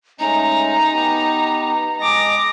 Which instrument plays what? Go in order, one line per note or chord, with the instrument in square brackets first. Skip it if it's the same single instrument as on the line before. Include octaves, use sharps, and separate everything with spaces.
[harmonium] G#3 A3 C#4 [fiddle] D#4 [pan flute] A#5
[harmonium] B3 G4
[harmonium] G#3 D#5 A5 [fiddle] A#5 D6